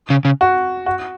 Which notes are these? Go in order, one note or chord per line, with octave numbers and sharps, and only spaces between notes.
C#3
C#3
F#4
F#4